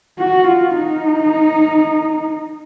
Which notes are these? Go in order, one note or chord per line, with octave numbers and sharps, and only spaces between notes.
F#4
F4
D#4